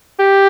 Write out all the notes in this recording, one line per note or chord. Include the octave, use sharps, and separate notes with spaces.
G4